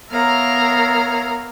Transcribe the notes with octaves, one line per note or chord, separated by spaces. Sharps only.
B3 A#4 C#5 E5 F5 A#5